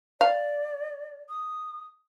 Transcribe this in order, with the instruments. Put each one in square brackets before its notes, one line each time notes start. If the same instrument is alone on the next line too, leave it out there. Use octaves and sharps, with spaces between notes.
[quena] D5 [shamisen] F5
[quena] D#6